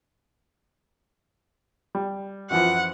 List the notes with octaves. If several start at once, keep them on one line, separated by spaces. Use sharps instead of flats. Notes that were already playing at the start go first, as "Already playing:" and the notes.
G3
F#2 E3 F3 F#5